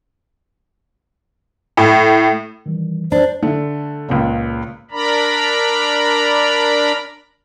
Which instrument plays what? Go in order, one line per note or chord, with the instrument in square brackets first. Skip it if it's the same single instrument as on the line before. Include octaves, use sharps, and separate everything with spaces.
[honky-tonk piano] A2
[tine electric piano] D#3 E3 G3
[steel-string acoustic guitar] D4 [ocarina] C5
[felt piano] D3 A3
C#2 A#2 C#3
[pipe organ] D4 A#4 D5 A#5 B5